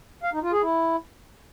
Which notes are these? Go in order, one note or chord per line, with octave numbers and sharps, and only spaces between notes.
F5
D#4
F4
G#4
E4